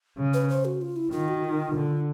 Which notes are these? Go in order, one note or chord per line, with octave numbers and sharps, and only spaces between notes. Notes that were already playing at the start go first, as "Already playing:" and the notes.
C#3
B4
C5
F#4
F4
E4
D#3 F4
F#4
F4
D3